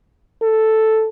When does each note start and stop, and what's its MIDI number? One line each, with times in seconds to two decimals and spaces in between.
0.42 1.09 69